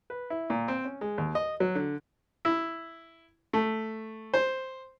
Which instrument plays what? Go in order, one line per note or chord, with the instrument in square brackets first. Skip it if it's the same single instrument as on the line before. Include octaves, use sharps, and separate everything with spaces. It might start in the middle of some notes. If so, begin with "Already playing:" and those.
[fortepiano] B4
E4
A#2
C4
C#4
G#3
D#2
D#5
F#3
D3
E4
A3
C5